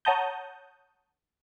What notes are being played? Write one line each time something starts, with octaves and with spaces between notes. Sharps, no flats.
C#5 F#5 A5 A#5 D#6 G6